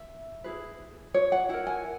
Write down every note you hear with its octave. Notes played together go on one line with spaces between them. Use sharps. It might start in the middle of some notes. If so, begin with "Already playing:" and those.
Already playing: E5
E4 G#4 B4
C#5
F#5
E4 A#4 F#5
G#5